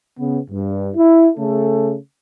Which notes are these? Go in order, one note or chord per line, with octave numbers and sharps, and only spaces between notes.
C#3 B3
G2
E4
C#3 A3 G#4 A4